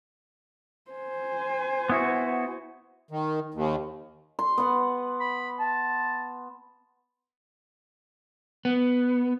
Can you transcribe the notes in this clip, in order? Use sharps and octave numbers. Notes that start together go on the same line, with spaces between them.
C5 G#5
B3 E4 F#4
D#3
D#2
C6
B3 F#5
B5
A5
B3